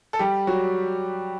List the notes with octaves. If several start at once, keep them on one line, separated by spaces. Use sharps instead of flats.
A4
G3 G4
F#3 F#4